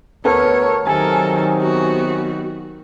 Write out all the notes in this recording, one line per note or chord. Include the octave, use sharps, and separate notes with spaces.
D2 B3 A4 A#4 C#5
C3 D#3 F#3 A4 A#4 G#5
B3 F#4